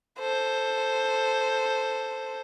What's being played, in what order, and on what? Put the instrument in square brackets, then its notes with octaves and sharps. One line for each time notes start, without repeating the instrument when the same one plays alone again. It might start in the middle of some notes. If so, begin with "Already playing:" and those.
[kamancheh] A4 C5